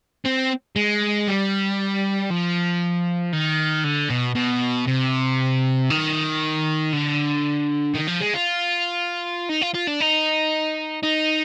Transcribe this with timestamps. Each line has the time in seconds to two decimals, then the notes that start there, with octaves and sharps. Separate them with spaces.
0.25 C4
0.76 G#3
1.27 G3
2.30 F3
3.33 D#3
3.84 D3
4.10 B2
4.35 B2
4.87 C3
5.90 D#3
6.93 D3
7.95 D#3
8.08 F3
8.21 G#3
8.34 F4
9.49 D#4
9.62 F4
9.74 F4
9.87 D4
10.00 D#4
11.03 D#4